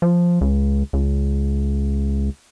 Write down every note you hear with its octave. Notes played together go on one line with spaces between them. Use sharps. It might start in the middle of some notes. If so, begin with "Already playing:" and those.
F3
C#2
C#2